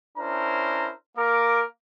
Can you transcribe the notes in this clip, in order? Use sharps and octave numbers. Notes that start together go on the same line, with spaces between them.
C#4 D4 E4 A#4 C5 A#5
A#3 A#4 D6